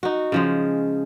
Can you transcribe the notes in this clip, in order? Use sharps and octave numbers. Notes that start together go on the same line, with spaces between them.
D#4 F#4
C#3 F3 G#3